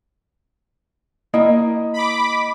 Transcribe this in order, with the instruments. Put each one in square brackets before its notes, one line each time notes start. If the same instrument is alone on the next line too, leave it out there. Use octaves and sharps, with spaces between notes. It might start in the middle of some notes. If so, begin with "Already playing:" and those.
[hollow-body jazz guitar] A#3 E4 G5 [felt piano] D#5
[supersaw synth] B5 D6